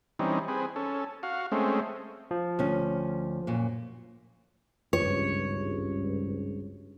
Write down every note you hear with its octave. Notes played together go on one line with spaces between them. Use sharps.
E3 G3 C4 C#4 D#4
C4 G#4 B4
C#4 A4
F#4 F5
G#3 A3 C4 C#4
F3
D2 C#4
F#2 A#2
G#1 C#2 G2 C#5